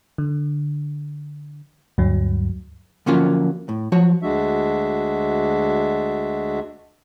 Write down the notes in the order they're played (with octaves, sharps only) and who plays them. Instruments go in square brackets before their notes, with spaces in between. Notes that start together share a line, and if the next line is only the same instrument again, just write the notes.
[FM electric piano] D3
D2 G2 F#3
[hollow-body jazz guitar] D3 F3 F#3 A#3 C#4 F4
A2
F3 F#3 F#4 C#5
[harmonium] D2 G#3 D4 F#4 E5